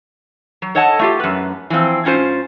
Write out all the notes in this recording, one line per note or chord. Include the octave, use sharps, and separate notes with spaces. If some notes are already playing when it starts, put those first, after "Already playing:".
F#3
A4 C#5 D#5 F#5 A5
A3 F4 G4
F#2 B4
E3 F3 C4
G#2 C#4 F4 C5